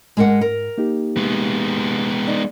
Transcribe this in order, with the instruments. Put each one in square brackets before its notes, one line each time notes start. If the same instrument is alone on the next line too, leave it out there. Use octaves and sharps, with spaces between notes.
[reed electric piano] G#2 [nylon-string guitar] G#3 A#4 F#5
[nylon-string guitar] A#4
[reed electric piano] A#3 D#4 G4
[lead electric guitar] G#3 B3
[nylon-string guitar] D#4 [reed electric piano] D5